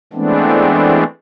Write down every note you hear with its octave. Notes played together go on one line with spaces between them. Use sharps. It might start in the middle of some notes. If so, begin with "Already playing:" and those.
E3 G#3 A3 B3 C4 D4